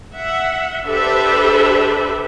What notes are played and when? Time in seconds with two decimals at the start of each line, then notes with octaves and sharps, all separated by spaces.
0.15 E5 F#5
0.88 D4 G4 A4 B4 C5 E5